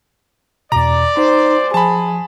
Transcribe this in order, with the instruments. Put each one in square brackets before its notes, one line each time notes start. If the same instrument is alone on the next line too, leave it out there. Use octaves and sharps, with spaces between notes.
[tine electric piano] E2 B2 [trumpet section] D5 [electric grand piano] A#5
[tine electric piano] D#4 [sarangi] C5
[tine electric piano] F3 [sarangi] G#4 [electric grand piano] A5 B5